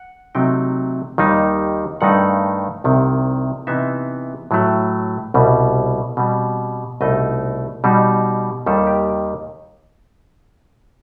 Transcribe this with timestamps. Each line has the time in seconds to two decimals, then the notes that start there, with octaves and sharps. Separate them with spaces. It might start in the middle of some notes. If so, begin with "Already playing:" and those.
Already playing: F#5
0.35 C3 F#3 A3 D#4 G5
1.18 D#2 D#3 G3 D#4
2.01 G2 D#3 A3 D#4 F#5
2.84 C2 C3 D#3
3.67 C3 E3 B3 D#4 E5
4.51 A2 F#3 A3
5.34 C2 B2 G3
6.17 B2 G3 C4
7.01 C2 B2 A3 D#4 D#5
7.84 B2 G3 D#4
8.66 D#2 D#3 G3 A4
8.87 G4